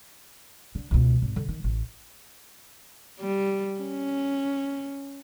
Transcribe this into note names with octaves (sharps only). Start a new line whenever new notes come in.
D3
C#2 B2
G#1
D3 D#3
D#3
A1
G3
C#4